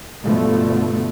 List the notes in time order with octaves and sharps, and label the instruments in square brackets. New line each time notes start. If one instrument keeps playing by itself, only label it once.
[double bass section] G2 B2 D3 F3 A3